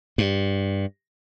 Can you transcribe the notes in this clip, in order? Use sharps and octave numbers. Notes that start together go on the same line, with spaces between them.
G2